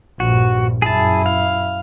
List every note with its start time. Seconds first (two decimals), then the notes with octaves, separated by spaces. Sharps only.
0.20 A#1 G2 F#4
0.82 F#2 E4 G#4 A5
1.26 F5